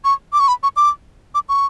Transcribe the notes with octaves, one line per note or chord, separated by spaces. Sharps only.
C#6
D6
C#6
B5
C#6
D6
D6
C#6